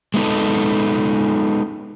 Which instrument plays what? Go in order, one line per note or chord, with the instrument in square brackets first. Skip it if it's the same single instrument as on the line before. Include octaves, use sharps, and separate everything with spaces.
[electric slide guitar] G#3 B3 D#4 A4